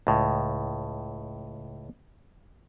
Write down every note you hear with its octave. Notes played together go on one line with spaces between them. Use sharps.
C#2 A2